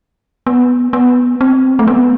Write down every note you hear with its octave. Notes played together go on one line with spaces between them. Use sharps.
B3
B3
C4
A3
B3